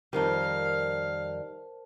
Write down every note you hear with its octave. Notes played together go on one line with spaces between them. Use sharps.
F2 D#3 G3 A#4 C5 F5 A5